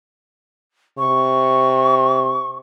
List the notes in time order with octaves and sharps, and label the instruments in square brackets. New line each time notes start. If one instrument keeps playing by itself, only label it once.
[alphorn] C3 [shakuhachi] C#6